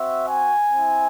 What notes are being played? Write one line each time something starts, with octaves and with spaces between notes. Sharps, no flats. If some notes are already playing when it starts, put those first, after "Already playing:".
Already playing: C4 F#4 E5
G#5
C4 E4